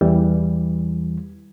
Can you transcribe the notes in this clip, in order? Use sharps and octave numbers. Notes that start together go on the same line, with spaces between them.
E2 E3 G3